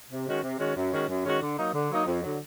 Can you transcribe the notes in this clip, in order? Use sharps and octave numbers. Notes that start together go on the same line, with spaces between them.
C3
D#3 G#3 C#4 F#4
C3
D#3 G#3 C#4 F#4
F#2
D#3 G#3 C#4 F#4
F#2
D#3 G#3 C#4 F#4
D3
F#3 A#3 D#4
D3
F#3 A#3 D#4
F2
D3 F#3